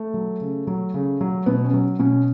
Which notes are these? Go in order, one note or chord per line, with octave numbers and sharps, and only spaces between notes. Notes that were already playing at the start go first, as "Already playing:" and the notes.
Already playing: A3
F#3
C#3
F#3
C#3
F#3
B2 B3
C#4
F#3
B2 C#4